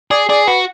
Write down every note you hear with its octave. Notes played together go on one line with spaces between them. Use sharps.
G#4 D5
G#4 D5
F#4 B4